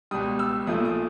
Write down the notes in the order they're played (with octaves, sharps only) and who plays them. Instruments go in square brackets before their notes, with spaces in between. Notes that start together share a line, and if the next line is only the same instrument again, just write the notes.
[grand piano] C#2 B2 G3 D#6
E6
B1 A#2 F3 A3 D#6
D#6